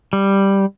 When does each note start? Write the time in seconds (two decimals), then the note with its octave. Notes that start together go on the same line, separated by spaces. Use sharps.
0.13 G3